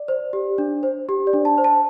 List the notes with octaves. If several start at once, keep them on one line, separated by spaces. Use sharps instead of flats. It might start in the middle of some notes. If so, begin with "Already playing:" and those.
Already playing: D5
C5
G4
D4
C5
G4
D5
D4
A5
C5
A5